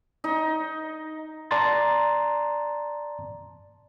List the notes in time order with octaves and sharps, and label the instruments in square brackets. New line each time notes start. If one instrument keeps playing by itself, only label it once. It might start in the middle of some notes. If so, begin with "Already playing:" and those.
[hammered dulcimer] D#4
[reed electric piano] D5 A5 A#5 C6 A6